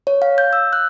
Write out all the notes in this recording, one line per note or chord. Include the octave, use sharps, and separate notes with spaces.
C#5
F5
G6
E6
F#6